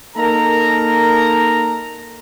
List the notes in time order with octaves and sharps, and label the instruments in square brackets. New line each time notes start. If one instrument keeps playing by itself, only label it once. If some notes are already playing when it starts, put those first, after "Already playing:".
[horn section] A#3 D#4 A4 A#4 A#5